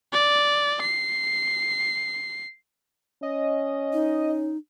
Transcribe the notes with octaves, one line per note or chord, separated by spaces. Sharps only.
D5
C7
C#4 D#5
D#4